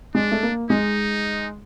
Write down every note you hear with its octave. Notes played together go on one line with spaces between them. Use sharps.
G#3 D4
A3
A#3
G#3 D#4